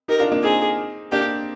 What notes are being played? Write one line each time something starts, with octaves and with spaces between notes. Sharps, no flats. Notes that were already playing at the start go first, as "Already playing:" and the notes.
D#4 G4 A#4
D4 F4
A#3 D4
C4 D#4 G#4
A#3 D4 G4